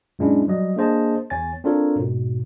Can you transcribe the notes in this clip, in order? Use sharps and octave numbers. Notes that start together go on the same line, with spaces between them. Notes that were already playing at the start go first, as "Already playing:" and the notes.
F#2 A#2 G#3 C#4 D4 E4
F#3 G3 D#5
A#3 D4 G#4 C5 D#5 A5
E2 C#5 G#5 A6
C4 D4 F4 A4 A#4 C#5
G#2 B2